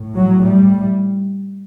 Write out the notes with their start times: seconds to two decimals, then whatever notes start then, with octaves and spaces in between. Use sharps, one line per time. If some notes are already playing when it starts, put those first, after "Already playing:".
Already playing: A2
0.15 F#3
0.43 G3